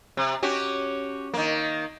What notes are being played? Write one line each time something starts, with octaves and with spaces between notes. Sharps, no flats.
C3
C#4 F#4 G4
D#3 A#3